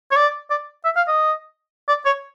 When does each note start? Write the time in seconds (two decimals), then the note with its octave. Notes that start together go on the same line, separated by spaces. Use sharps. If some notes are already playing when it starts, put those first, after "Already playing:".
0.11 C#5
0.16 D5
0.51 D5
0.85 E5
0.96 F5
1.08 D#5
1.89 D5
2.06 C#5